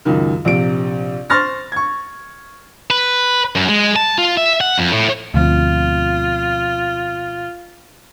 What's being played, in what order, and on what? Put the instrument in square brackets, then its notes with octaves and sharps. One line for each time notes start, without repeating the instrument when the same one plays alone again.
[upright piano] C#2 F#2 D#3
A#1 C3 D7
C5 C6 C#6 F6 A6 A#6
C#6 G#6
[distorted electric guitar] B4
F#2
G#3
A5
F4
E5
F#5
F2
A2
[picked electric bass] D2 [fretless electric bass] B2 F3 C4 [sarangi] F4